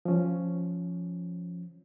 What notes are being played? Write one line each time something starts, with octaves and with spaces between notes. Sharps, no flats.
F3 C#4